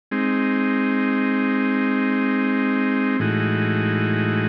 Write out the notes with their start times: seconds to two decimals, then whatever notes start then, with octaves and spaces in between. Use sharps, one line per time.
0.11 G#3 C4 D#4
3.20 A2 E3 G#3 D#4 F#4